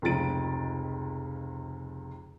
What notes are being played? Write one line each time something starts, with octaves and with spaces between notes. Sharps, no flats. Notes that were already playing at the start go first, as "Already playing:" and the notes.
F1 C#2 F3 A6 D7